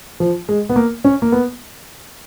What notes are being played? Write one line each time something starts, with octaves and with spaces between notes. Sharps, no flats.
F3
G#3
B3
A#3
C#4
A#3
B3